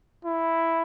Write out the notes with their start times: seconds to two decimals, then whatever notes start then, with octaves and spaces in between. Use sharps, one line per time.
0.25 E4